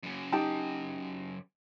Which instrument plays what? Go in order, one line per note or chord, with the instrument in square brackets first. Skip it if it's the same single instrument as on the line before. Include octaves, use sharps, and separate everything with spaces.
[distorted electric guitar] F#2 C#3
[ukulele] D#4 G4 A5